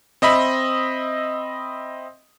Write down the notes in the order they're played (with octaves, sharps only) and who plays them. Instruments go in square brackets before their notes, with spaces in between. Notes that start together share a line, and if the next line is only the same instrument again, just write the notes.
[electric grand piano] C4 D#5 E5 B5